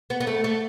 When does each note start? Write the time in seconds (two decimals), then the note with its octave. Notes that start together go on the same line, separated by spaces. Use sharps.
0.10 B3
0.20 B3
0.27 A3
0.44 A3